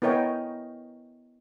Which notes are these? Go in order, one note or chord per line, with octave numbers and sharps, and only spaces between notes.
B3 E4 A#4 C#5 D#5 G5